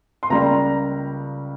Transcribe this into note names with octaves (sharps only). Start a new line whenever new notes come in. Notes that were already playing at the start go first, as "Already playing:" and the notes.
C6
C#2 C#3 G3 A#3 A#5